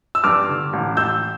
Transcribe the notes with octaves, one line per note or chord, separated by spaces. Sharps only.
E6
G2 D6 F6
D3
A1
A1 E6 G6